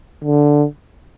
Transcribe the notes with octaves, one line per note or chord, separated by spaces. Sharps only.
D3